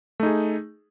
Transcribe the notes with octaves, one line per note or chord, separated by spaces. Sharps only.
A3 D#4 G#4